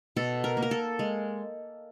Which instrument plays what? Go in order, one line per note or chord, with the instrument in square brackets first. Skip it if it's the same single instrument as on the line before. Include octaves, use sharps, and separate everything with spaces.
[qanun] B2 A4
A#4
A#3
A#4
A4
G#3